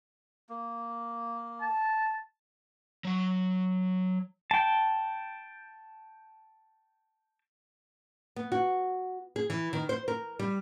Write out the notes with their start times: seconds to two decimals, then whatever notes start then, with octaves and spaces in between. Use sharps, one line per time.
0.49 A#3
1.61 A5
3.04 F#3 F#5
4.51 G5 A5
8.36 B3
8.52 F#4
9.36 G#4
9.50 E3
9.73 D#3
9.89 C5
10.08 A#4
10.39 G3